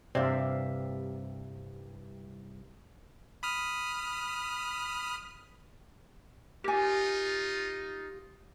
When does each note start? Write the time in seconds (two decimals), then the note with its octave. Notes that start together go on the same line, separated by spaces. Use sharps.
0.15 C2 G2 C3 C4 D5 E5 F5
3.43 B5 D#6 F6
6.64 D#4 F4 G4 A#4 G#5